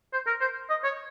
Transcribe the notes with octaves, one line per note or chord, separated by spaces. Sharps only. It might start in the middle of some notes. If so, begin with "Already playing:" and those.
C5
A#4
C5
D#5
C#5